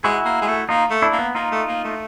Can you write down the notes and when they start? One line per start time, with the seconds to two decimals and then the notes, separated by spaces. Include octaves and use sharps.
0.04 G#3 E4 F#4
0.25 A#3
0.42 G#3
0.48 A3
0.69 A#3 D#4 F4
0.91 A3
1.02 D4 E4
1.13 A#3
1.18 B3
1.35 A#3 D#4 F4
1.52 A3
1.68 A#3
1.84 A3